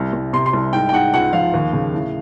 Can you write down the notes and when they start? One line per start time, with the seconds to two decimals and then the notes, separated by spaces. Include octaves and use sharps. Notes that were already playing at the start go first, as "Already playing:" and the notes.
Already playing: C2 C3
0.13 C2
0.33 C3 C6
0.46 C6
0.53 C2
0.73 G#2 G5
0.89 G5
0.93 G#2 F#5
1.14 C#2 F#5
1.33 F3 F5
1.53 D#2
1.73 C#3
1.93 A2